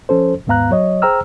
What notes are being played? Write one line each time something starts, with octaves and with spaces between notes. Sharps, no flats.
F3 C#4 A4 C5
D#2 G#2 B3 F5 A#5 F#6
F#3 C#5 D#5
G#4 C5 G5 A#5 E6 F6